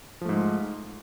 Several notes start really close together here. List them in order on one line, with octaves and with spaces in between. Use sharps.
F3 A3 G#2 G#3